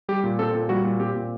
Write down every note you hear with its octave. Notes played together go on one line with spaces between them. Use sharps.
G3 G4
A#2
C4 A4
A#2
G3 F#4
A#2
C4 G4
A#2